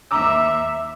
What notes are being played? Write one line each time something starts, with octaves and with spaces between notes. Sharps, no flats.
D#2 E5 A#5 D6 E6